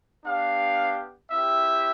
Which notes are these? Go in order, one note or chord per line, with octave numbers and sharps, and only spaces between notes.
B3 D4 G4 F5
C4 E4 G4 E5